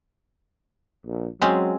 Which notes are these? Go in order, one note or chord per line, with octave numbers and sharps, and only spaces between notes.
A#1
F#3 G#3 C4 C#4